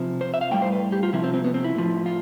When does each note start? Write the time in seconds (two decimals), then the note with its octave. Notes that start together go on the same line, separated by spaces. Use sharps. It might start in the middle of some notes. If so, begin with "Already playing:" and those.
Already playing: C3 F3
0.21 C5
0.34 E5
0.41 F5
0.51 A2 G3 G5
0.62 C5
0.72 B4
0.92 G4
1.03 F4
1.13 C3 F3 E4
1.24 C4
1.34 C4
1.44 B3
1.54 C4
1.64 E4
1.75 A2 F3
2.06 F4